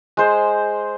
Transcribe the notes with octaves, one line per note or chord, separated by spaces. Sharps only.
G#3 C5